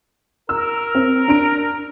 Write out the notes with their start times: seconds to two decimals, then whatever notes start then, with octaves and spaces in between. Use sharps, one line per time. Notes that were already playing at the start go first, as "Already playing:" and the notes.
0.49 A#4 E6
0.95 C4
1.28 D4 D7